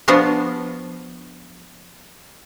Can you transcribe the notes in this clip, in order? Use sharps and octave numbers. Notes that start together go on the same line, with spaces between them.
F3 B3 D4 F4 F#4